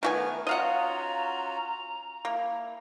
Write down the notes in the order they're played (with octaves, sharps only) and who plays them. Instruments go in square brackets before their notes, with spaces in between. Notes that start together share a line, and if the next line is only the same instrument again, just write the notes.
[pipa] D#3 F#4 G#5 [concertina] A3 B3 F6 [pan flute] B4
[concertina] C#4 F4 F#4 [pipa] D#5 F5 F#5 [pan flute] A#5
[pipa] A#3 [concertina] E4